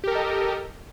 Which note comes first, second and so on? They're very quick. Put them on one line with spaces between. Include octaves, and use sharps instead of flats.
G4 A#4 A4 D#5